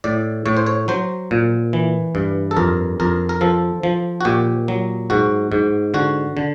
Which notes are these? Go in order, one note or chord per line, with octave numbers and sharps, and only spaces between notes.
A2 D5
A2 C#5
C5
C#5
F#3 C5
A#2
E3
G2
A4
F2 A#4
F2 A#4
A#4
F3 A4
F3
F#4
A#2 G4
F#3
G#2 F#4
G#2
D3 F#4
D3